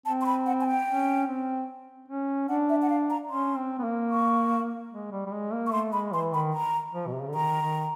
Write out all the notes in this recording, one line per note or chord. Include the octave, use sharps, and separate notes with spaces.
C4 A5
C6
B5
F#5
G#5
G5
C#4
C4
C#4
D4 F#5
E5
F#5
F5
A#5
C#4 C6
C4
B3
A#3
C#6
G#3
G3
G3
G#3
A#3
C#6
A3 C6
G#3 B5
E3 C6
D#3 B5
A#5
F3
B2
C3
C#3
D3
D#3 A#5
D#3